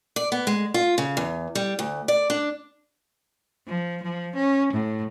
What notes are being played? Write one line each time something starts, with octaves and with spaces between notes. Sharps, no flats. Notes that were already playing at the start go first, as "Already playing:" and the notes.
D5
B3
G#3
F4
C#3
E2
G3
D2
D5
D4
F3
F3
C#4
A2